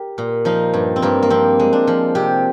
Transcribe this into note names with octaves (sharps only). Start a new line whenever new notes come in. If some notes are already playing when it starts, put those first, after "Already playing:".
Already playing: G4 A#4
A#2
F3 D#4
G2
C4
G2 A#3
A#3
F3 C4
G#3
D4
F3
C3 G4